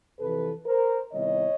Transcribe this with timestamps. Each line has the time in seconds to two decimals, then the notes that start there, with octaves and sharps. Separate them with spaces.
0.19 F2 C3 E3 A4 B4
0.66 A#4 C5
1.13 C3 D#3 G3 B3 E4 C#5 D#5